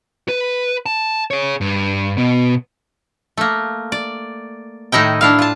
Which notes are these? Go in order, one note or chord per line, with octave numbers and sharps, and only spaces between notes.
B4
A5
G#4 C#5
G2
B2
A3 A#3
D5
A2 D#3 D#4 E4 G5
D4 E4 F5
F4 A5